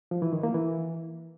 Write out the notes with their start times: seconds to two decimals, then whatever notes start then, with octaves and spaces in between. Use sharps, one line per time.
0.11 F3
0.22 E3
0.33 D#3
0.43 A#3
0.54 E3